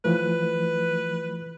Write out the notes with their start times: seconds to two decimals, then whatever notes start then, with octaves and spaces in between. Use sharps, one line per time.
0.05 E3 F3 A3 B4